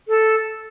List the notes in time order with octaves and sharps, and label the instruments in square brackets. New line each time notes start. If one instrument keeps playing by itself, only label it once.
[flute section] A4